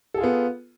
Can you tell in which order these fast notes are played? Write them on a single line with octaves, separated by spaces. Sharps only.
A4 G#4 F4 B3